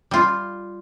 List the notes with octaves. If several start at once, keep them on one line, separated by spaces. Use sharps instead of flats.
G3 F4